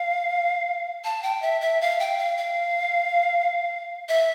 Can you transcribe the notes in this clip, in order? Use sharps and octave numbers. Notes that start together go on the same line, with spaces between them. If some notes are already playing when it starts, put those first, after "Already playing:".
Already playing: F5
A5
G5
E5
E5
F5
G5
F5
F5
E5